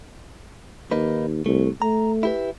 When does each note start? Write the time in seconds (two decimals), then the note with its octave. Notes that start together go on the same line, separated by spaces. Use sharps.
0.91 D#2 A#3 D#4 B4
1.46 C2 A3
1.82 A3 A#5
2.23 E4 G4 B4